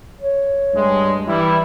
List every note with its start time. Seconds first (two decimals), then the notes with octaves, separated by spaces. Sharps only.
0.21 C#5
0.74 G2 G#3
1.28 E3 G3 E4